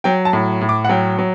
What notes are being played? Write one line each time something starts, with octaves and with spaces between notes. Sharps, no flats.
F#3 G5
A5
A2
A2
D6
F#5
F#3 G5
F#3